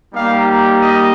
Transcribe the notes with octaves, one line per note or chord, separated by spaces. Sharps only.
G3 A#3 D#4 G4 F5
D#5